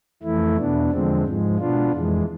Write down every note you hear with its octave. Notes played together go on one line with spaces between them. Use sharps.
F2 E3 A3 E4
E2 B2 B3 D4
E2 D3 F3 G#3 C4
G#2 F3 G#3
B2 B3 D4 F4
F2 E3 G#3